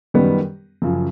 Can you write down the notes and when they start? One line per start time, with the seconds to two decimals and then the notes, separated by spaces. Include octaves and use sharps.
0.14 F#2 D#3 G3 B3
0.82 F#2 C#3 F3